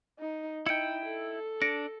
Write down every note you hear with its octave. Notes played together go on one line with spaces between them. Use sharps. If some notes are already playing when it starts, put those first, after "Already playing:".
D#4
D#4 E4 G5 C#7 D7
A4
D4 A#6 C#7 D7